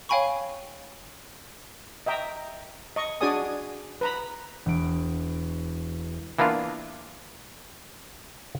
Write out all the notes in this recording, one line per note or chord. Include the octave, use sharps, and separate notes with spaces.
C#5 F5 G5 G#5 B5 C#6
D#5 E5 G5 A#5
D#5 C#6
D4 F#4 G#4 D5 G#5 D#6
B4 A#5 B5
E1 D7
E3 A#3 B3 D4 F4